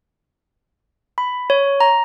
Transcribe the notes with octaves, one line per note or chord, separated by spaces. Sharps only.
B5
C#5
A#5